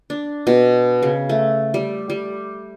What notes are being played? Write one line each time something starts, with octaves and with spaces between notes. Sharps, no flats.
D4
B2
C#3
A3
G3
G3